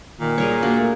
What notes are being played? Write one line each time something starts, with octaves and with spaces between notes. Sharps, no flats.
A#2 D#3
G3 G#4 A#4 C#5
A#3 D4 F#4
A3